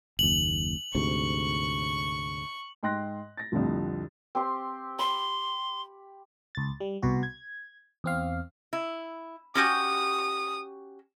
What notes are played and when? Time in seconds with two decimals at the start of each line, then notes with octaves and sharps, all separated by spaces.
0.19 F#1 D#2 F#7
0.95 D2 G#2 C3 C#6
2.83 G#2 G5 C6 F#6 A#6
3.37 A6 A#6
3.52 C2 F2 A2 D3 F3
4.35 C4 G4 C6
4.99 B5 C6
6.55 C#2 A6
6.80 G3
7.02 C2 B2 F#4
7.23 G#6
8.04 E2 C4 F5
8.73 E4
9.55 C#4 F#4 G4 D#6